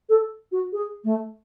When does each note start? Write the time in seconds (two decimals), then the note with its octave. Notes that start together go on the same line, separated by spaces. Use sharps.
0.09 A4
0.52 F#4
0.73 G#4
1.04 A3